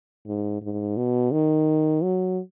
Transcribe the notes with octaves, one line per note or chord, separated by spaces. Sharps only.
G#2
G#2
B2
D#3
F#3